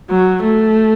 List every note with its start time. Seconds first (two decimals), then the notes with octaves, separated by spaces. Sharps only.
0.10 F#3
0.44 A3